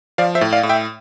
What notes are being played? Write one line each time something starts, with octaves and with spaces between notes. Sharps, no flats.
F3 D5 F5
C5 E5
A2
D5 F5
A2
E5 G5